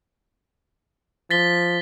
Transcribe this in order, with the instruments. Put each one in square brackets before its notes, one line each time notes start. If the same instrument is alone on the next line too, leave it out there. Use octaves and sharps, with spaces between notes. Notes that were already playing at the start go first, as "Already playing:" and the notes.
[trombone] F3 [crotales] A6 B6 G7